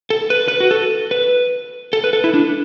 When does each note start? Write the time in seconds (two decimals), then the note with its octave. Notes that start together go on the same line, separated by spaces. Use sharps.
0.10 A4
0.30 B4
0.48 B4
0.60 F#4
0.71 A4
1.11 B4
1.93 A4
2.04 B4
2.13 A4
2.24 E4
2.34 D4